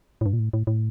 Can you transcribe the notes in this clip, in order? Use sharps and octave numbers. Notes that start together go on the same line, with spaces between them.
A2
G2
A#2
A2
A2
A2